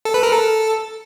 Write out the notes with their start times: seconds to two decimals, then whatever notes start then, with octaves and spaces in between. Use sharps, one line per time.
0.05 A4
0.14 B4
0.23 A#4
0.32 A4